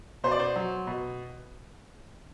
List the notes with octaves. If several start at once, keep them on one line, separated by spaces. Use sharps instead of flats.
B2 C5
D5
C5
F#3
B2